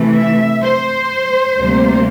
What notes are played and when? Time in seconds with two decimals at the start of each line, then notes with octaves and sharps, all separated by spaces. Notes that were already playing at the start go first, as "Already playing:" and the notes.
Already playing: C3 E3 A3
0.16 E5
0.63 C5
1.58 D2 C3 G3 A#3